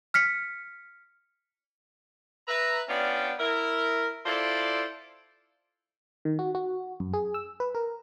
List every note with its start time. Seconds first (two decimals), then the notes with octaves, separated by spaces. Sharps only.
0.14 F6 B6 C#7
2.48 B4 E5 A#5
2.89 B3 C#4 D4 F4 D5 G5
3.39 E4 A#4
4.26 E4 F4 A4 C5 D5
6.25 D#3
6.39 F#4
6.55 F#4
7.00 F#2
7.13 G#4
7.34 E6
7.60 B4
7.75 A#4